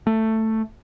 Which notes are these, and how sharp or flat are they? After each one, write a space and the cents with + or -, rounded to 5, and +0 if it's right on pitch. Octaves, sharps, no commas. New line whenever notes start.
A3 +10